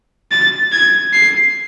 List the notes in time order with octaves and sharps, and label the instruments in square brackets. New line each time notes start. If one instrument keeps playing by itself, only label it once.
[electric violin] A6
G#6
C7